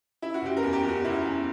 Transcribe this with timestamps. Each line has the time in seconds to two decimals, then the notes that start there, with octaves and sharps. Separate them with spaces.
0.22 E4
0.34 F#4
0.41 F#1 G4
0.57 A#4
0.63 E2
0.73 G4
0.83 E2
0.89 F#4
1.04 F#1 E4
1.26 E2